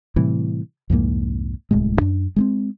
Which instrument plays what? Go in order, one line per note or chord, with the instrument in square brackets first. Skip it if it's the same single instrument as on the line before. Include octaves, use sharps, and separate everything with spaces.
[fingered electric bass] A2 C3 E3 G3
C2 F2 G#2 A#3
D1 C2 A2 G#3
F#2 D4
G#3 A#3 C4